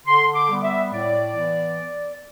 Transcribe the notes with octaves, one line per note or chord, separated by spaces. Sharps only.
D3 C6
D6
G3 B3
E5
A2 D5
E3 B3